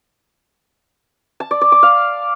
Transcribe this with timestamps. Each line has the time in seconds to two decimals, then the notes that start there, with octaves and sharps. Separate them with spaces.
1.40 A5
1.51 D5
1.61 D5
1.72 D6
1.83 F5